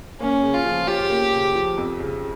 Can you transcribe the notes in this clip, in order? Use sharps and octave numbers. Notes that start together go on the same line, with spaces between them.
A#3 C#4
C#3
F4
F3
C#4 G4
A#3
C#3
F3
F2
C#3